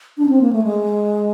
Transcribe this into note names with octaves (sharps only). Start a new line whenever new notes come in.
D4
C#4
C4
A#3
A3
G#3